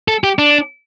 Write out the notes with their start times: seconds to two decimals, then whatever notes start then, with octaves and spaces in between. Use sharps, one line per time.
0.08 A4
0.24 G4
0.39 D4